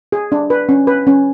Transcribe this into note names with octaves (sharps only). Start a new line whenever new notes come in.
G#4
D4
B4
C#4
B4
C#4